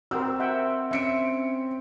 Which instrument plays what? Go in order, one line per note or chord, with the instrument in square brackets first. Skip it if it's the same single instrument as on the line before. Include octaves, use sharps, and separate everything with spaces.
[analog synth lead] C4 [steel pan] F#4 G4 A#4 [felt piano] E6
[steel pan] E5 F#5 G5
[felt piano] C#4 C#7 D7 [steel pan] E5